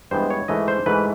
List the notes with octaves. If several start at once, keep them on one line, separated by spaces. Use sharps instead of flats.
G2 E3 G#3 B3 C5
C#5
G#2 E3 A3 D#5
C5
G#2 E3 A3 B4